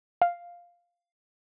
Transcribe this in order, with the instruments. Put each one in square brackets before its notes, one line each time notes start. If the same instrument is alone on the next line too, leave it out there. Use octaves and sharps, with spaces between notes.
[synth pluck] F5